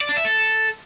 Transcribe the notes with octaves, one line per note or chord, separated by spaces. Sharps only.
D5
D4
E5
A4